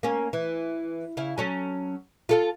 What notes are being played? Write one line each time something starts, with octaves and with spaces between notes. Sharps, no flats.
A#3 C#4
E3
C#3 E4 F5
F#3 C#4 A4
F4 A4 F5